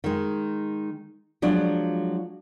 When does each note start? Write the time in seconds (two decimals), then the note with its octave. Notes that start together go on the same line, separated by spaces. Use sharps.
0.04 D#3 G#3
1.42 F3 F#3 G#3 D4